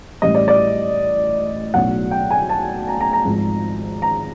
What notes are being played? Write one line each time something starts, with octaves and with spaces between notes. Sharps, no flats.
A1 A2 E3 G3 D#5
D5
D5
B1 A2 F#3 F#5
G5
G#5
A5
A#5
A#5
A#5
G#1 G#2 F3
A#5